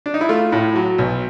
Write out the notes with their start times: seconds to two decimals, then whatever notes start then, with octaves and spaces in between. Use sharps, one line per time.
0.06 D4
0.14 D#4
0.21 E4
0.29 A3 F4
0.52 A2
0.75 F#3
0.98 B1